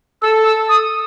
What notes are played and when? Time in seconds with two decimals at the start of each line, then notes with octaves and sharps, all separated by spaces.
0.22 A4 E6
0.45 E6
0.69 D#6